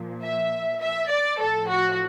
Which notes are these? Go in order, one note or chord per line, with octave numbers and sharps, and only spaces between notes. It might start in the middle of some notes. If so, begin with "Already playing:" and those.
Already playing: A#2 F3
E5
E5
D5
A2 F3 A4
F#4